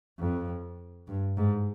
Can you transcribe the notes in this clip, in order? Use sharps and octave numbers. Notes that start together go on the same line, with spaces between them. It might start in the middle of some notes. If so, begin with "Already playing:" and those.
F2
G2
G#2